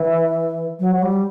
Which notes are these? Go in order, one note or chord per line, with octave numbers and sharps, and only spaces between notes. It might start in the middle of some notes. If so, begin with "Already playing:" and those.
Already playing: E3
F#3
F#3
G3